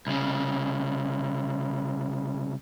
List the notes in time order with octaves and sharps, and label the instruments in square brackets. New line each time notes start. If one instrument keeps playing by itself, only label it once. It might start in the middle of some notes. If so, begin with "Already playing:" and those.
[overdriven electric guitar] C2 C#3